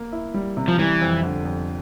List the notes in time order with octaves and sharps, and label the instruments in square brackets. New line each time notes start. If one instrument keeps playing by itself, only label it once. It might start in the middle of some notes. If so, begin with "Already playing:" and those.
Already playing: [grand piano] A#3
E4
G3
C3
[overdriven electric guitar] F3
[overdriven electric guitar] E3 [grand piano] G3
[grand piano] F2
D3
F2